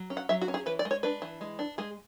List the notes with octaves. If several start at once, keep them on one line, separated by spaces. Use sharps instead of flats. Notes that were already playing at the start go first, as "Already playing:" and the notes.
Already playing: F#3
C#4
F#5
F#3 E5
F#4
C#4
G#4
E3 B4
D5
G#3
C#5
D4 B4
E3
G#3
D4
G#3 G#4